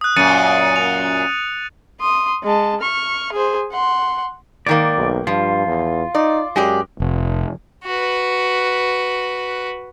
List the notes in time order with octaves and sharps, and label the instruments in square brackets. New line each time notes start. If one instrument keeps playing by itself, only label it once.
[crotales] D#6 F#6
[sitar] F#2 A#2 [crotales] A6 C#7 D#7
[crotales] F7
[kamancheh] C6 D#6
G#3 A5
C#6 F6
G#4 C5
F#5 C6
[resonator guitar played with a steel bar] G#2 D#3 A#3 [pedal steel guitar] D5
[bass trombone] B1
[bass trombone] G2 [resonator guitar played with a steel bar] F3 [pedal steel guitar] F4
[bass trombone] E2
[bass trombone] D#4 [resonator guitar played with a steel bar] D5
[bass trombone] F#2 [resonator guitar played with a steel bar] G#3 G4 D5
[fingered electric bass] F1
[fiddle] F#4 B4